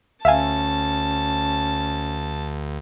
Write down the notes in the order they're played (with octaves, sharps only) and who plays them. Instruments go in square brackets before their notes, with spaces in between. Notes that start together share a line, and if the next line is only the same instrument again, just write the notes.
[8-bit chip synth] D2 [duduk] C#4 [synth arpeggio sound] E5 F5 G#5 [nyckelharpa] A5